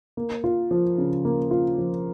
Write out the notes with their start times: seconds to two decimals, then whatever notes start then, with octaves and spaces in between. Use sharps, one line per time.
0.17 A#3
0.44 F4
0.71 F3
0.98 C#3
1.25 A#3
1.51 F4
1.78 F3